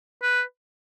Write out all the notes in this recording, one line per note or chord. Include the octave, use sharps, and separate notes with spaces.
B4